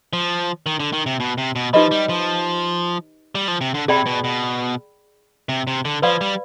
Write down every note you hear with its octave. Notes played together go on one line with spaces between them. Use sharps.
F3
D#3
D3
D#3
C3
B2
C3
B2
F3 D#4 G4 B4 D#5 B5
G3
F3
G3
F3
C3
D3
C3 G#4 D5 G5 B5
B2
B2
C3
C3
D3
F3 B4 D5 F5 B5
G3